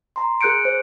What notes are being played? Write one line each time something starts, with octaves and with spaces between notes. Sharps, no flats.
A#5 C6
G#4 A#4 F#6 G6 C#7 D7
C5